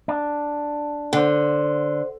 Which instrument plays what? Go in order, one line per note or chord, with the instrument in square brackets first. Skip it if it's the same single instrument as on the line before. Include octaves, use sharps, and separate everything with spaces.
[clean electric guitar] D4
[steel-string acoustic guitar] D3 [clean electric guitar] C5 F#5